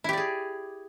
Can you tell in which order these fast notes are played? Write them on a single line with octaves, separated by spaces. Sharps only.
E4 G4 D5 G#4